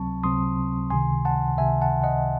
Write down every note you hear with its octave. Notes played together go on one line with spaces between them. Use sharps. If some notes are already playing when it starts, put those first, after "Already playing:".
Already playing: C#2 C3 F#3 C4 A5 C#6
C#2 C3 F#3 C4 C6 D#6
C#2 C3 D#3 G#5 C6
F#5 A5
C#2 C3 D#3 E5 G#5
F#5 A5
D#5 F#5